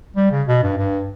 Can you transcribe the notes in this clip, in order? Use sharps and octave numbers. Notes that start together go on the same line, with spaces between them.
G3
C#3
B2
G2
G2